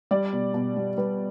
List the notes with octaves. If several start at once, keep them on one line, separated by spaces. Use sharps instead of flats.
G3 D5
B2
B2
G3
G3 B4